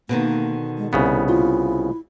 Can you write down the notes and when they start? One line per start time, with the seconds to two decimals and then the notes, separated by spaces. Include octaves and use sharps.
0.09 B2 D3 D#3 A#3
0.78 G#3
0.93 C2 C#3 B3 E4
1.29 E4 F4